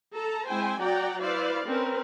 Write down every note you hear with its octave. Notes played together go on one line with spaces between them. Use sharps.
A4 A5 A#5
G#3 C4 E4 C5 G5 G#5
F#3 F#4 D5 F#5 G5 A#5
E4 B4 C5 D5 F5
C4 C#4 A#4 B4